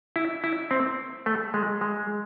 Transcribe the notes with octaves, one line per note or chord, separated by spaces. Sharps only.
E4
E4
C4
A3
G#3
G#3